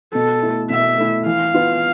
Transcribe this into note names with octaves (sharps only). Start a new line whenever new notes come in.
B2 A4
A3 E4
B2 E5
A3 E4
E3 F5
B3 F4 B4